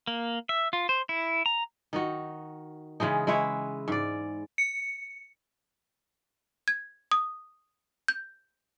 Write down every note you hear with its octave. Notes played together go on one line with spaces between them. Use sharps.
A#3
E5
F4
C5
E4
A#5
D#3 D#4 F#4
C#3 E3 G#3 D#4
G#3 E4 B4 C#5
G#2 D5
C#7
G#6
D#6
G6